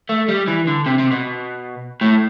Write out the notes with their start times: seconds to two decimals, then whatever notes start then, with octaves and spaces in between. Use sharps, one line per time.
0.09 A3
0.28 G3
0.48 E3
0.67 D3
0.86 C3
0.99 C3
1.11 B2
2.01 A2